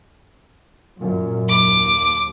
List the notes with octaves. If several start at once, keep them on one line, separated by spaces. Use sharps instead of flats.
F#2 A#2
D#2 D6